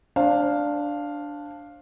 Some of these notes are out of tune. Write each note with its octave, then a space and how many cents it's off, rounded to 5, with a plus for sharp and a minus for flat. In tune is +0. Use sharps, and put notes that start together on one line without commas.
D4 +0 C5 +35 F5 +0